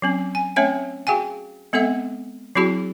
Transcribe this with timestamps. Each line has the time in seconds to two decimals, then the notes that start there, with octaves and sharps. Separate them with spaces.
0.02 F#3 C4 C#4
0.35 G#5
0.56 A3 C4 C#4 C#5 E5 G5
1.07 F#4 G#4 F5 G5 G#5
1.73 G#3 B3 C4 A4 E5 F#5
2.55 F#3 C4 E4 F#4 G#4 A5